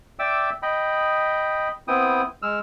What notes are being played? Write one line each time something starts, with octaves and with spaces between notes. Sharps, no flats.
D5 E5 G5 D6 E6
D#5 G5 B5
B3 C4 E4 G5 D#6
G#3 E6 F6